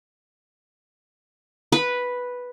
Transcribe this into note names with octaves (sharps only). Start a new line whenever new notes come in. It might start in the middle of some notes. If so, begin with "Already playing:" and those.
B4